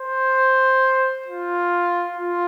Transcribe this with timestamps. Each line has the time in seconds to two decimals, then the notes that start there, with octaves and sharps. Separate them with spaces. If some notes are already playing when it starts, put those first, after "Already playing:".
Already playing: C5
1.28 F4
2.17 F4